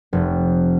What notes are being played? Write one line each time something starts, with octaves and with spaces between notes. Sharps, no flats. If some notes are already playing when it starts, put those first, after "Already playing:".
F1